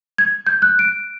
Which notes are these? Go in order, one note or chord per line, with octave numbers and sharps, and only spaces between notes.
G#6
G6
F#6
D7